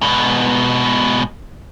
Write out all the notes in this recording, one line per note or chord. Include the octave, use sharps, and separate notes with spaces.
G#2 B2